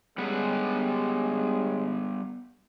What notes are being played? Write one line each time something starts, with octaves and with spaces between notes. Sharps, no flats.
G3 G#3 B3 C#4 G4 F#5